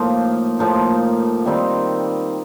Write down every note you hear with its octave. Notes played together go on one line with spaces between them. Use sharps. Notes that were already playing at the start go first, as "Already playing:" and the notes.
Already playing: A2 F3 A#3 D#4
A2 F3 A#3 D#4
D#3 G3 C4 D#4